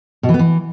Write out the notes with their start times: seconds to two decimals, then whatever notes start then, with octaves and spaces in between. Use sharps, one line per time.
0.23 B2
0.29 E3
0.34 B3
0.39 E3